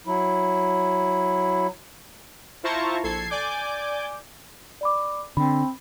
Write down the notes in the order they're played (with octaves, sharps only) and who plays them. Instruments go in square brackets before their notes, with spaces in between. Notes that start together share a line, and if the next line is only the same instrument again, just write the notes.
[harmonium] F#3 E4
[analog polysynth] E4 F4 C5 A5 A#5 C#6
A#1 A4 G#6 C7
D5 G#5 D6 G6
[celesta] D5 B5 D6
[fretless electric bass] D3 [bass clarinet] C4 [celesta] B5